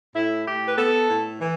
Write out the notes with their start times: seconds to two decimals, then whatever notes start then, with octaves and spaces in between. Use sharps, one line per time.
0.15 A2 E4
0.47 A2 G4
0.67 B4
0.78 B3 A4
1.10 A2
1.41 E3